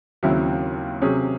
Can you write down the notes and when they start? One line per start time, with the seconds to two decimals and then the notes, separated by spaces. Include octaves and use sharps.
0.23 D#2 C#3 F#3 C4 E4
1.02 C3 F#3 C#4 G#4